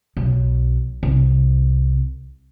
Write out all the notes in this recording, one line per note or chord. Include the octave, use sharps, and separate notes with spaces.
B1
C2